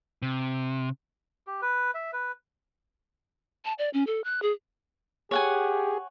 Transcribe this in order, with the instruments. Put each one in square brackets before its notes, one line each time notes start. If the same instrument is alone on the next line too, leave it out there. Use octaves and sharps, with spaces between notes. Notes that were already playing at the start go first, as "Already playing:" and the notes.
[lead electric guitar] C3
[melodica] G4
B4
E5
B4
[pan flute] A5
D5
C#4
A4
F#6
G#4
[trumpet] G4 [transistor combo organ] G#4 [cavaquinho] C#5 F#5 G#5